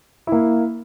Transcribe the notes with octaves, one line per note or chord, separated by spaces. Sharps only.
A#3 E4